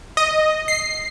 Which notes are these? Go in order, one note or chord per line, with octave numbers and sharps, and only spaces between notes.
D#5
C7